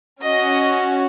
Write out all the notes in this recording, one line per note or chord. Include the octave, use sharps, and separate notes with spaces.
C#4 F#4 D#5